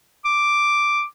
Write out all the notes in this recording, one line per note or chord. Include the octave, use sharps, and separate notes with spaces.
D6